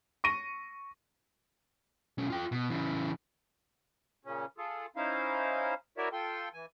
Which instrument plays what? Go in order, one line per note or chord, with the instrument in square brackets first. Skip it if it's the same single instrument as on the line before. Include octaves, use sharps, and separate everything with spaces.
[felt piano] C#6 A#6 D#7
[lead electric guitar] B1 C#4
F4 G5
B2
C#3 E3
[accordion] A#2 C#3 C#4
F4 G#4 A4
C#4 D#4 E4 C5 F5
E4 F#4 A#4 C#5 D5 E5
F4 A4 G5 C6
E3 G#5